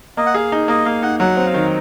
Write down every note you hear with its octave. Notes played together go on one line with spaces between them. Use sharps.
A#3 D#5
F#5
G#4 F5
D#4
A#3 D#5
A#3 F5
D#4 F#5
F#3 F#5
C4
F5
D#3